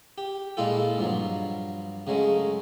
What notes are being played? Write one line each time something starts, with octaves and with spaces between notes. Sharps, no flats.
G4
A#2 G#3 E4 F4 A4
G2 F3 F#3
C#3 F#3 G#3 A3